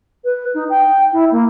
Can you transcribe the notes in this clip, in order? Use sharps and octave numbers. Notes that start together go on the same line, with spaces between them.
B4
D#4
G5
E4
A#3